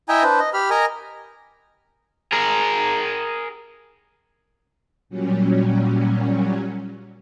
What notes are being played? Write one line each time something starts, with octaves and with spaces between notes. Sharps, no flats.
E4 D#5 E5 G5 G#5 A#5
D4 B4 C5
D#5
G4 B5 F6
A#4 D#5 G#5 A#5
G#4 A#4
A#2 F#3 G3 C#4